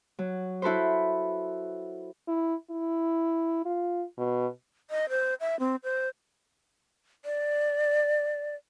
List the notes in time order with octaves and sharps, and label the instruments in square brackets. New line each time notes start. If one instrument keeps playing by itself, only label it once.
[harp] F#3
E4 F#4 A4 B4 C5
[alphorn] E4
E4
F4
B2
[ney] D#5
C5
E5
C4
C5
[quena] D5